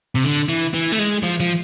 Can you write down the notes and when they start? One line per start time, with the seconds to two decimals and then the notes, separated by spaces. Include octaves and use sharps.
0.15 C3
0.24 D3
0.48 E3
0.74 E3
0.92 A3
0.99 G#3
1.23 F3
1.40 F3